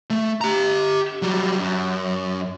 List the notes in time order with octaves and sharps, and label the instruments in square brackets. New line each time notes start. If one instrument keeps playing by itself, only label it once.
[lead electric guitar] A3
G4 A#5
F#3 G3
F#2